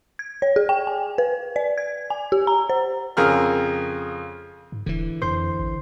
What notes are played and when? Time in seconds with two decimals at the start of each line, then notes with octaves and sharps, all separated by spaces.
0.19 G#6
0.42 C#5
0.56 G#4
0.69 G5
0.87 G#5
1.18 B4
1.56 D5
1.78 G#6
2.10 G#5
2.32 G4
2.47 A#5
2.70 C5
3.17 F2 C#3 G#4 A#4 F6
4.72 G#2
4.86 D#1 D3 E3
5.22 F2 C5
5.59 A1